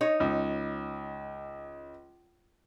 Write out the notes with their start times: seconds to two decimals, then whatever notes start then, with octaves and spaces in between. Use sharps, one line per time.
0.01 D#4 C#5
0.20 C#2